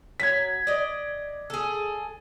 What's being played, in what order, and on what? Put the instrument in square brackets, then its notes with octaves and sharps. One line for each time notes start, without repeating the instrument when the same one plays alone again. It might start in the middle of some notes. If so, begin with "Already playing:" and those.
[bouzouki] F#3 [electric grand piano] G#6 B6
[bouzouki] D5 D#5
G#4 A4